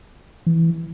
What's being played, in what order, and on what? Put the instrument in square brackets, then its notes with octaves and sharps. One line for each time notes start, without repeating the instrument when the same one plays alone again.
[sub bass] E3